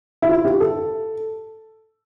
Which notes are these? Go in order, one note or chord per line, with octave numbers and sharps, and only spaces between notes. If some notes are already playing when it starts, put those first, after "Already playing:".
E4
F4
G4
A4